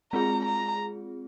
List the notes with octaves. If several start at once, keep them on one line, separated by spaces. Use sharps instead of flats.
G#3 C4 F4 G#4 A#5
A#5